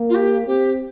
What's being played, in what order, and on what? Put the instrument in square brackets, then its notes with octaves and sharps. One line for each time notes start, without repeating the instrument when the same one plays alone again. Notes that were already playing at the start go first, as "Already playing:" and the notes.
Already playing: [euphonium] A#3
[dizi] F4
G4
[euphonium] C4 [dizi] G4